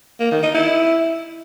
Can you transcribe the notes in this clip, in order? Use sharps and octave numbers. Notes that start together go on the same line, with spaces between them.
A#3
D#3
D#4
E4